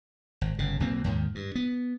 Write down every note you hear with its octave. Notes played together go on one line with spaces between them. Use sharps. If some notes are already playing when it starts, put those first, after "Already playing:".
G#1
G1 C#3
B1 B2 A#3 C4
D#2 G#2 D#3
G2
B3